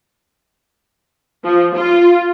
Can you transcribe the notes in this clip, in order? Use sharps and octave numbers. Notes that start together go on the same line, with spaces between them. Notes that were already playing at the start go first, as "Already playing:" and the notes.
F3
F4